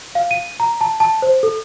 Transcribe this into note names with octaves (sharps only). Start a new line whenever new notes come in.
F5
D#7
A#5
A5
A5
C5
A4